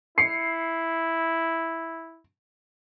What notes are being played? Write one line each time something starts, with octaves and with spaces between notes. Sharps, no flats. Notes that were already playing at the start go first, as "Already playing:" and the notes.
E4 C7 C#7